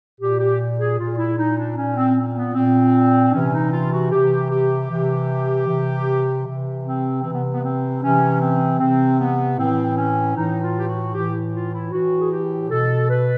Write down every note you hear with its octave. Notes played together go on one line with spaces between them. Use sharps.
A#2 G4
G4
G#4
A#2 F4
E4
D#4
D4
A#2 C#4
C4
B3
A#2 C4
D4
C3 E3 C#4
D#4
F4
F#4
C3 E3 G4
G4
C3 E3
C3 E3
C3 E3
C4
C3 E3 C4
B3
B3
C4
C3 E3 C#4
C4
C3 E3 C4
B3
A2 E3 C4
C#4
A2 E3 D#4
F4
G4
F#4
A2 E3 G4
F4
E4
A2 E3 F#4
G#4
G4
B2 A4
B4